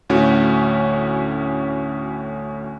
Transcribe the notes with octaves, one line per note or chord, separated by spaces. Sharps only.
D2 A2 C#4 F#4